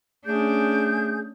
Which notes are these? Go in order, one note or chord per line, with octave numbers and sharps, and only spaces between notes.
A3 C#4 D4 G#4 G6